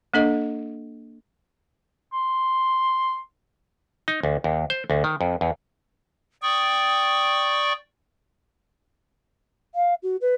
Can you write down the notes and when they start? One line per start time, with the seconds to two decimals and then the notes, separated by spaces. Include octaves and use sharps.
0.14 A#3 D4 A4 D#5
2.13 C6
4.08 D#4
4.23 D2
4.44 D#2
4.70 C5
4.90 D2
5.04 D#3
5.21 F2
5.41 E2
6.42 D5 G5 C#6 D#6
9.75 F5
10.03 F#4
10.21 B4